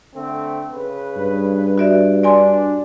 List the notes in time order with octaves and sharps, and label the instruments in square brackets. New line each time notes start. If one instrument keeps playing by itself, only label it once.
[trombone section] D3 A3 C4
C#3 B4
[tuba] G2
[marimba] F#4 D5 E5
[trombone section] D4 [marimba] D5 G#5 C6